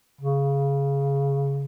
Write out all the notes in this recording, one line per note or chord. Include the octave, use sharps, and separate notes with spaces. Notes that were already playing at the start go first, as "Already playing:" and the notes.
C#3